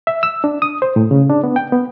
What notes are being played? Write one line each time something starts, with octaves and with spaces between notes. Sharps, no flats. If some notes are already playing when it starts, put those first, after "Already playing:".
E5
E6
D4
D#6
C5
A2
C#3
D4
B3
G5
B3